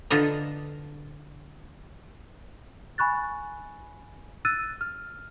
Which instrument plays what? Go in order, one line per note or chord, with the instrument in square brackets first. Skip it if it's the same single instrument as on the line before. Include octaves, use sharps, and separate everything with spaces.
[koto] D3 F4 A4 B4 D#5 A#5
[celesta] G#5 B5 C#6 F#6 A6
E6 F#6 A6 D#7
F6